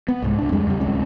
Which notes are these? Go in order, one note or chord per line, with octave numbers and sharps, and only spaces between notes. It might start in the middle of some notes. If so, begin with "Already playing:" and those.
B3
C2 G#2
C#2 D4
F2 G3 G#3
E2 C#3 G3
D1 C2 G#3 C#4